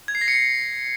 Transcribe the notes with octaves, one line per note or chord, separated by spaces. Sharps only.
G#6
C7
A#6
C#7
C7